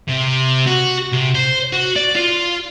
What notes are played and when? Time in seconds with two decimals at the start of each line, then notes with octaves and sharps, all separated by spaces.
0.09 C3
0.66 F#4
1.13 C3
1.35 C5
1.73 F#4
1.96 D5
2.16 F4